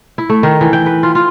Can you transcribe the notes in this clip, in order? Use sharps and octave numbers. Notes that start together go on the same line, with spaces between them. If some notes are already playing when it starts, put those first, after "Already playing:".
E4
A3
D#3
E3
G5
B4
F4
F4